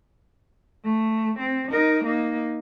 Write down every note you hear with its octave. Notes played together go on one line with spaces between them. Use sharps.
A3
C4
D#4 A#4
A#3 D#4